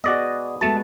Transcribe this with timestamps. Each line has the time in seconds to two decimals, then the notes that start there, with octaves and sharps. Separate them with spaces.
0.04 B3 F#4 G#4 D5 D#5
0.61 G#3 A3 B3 F#4 A5